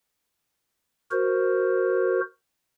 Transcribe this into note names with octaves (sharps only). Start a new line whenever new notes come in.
F#4 A#4 C5